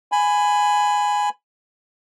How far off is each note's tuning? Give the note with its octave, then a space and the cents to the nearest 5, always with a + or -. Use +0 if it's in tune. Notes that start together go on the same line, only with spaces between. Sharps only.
G#5 +0 B5 +15